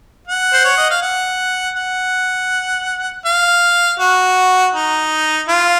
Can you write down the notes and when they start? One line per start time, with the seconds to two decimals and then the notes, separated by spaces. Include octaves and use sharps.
0.27 F#5
0.53 C5
0.65 C#5
0.77 D#5
0.90 F5
1.02 F#5
1.76 F#5
3.26 F5
4.00 F#4
4.74 D#4
5.49 F4